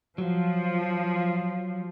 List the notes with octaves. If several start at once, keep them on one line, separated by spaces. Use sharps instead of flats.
F3 F#3